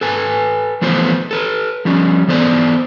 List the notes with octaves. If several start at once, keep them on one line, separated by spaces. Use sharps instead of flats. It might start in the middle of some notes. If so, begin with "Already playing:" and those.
A4 B4 G#5
E3 F3 A3 B3 C5
A4 B4
F3 G3 C#4
E3 B3 A4 C5 D5